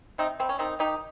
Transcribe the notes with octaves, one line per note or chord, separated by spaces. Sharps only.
C3 C4 D#4
G3 C4
C#4
D#3 C4 D#4
D#3 D#4 G4